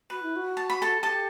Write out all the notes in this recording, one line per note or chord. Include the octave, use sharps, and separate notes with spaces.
F#4 B4
E4
F#4
A5
B5
A4 A5
G4 A4 A5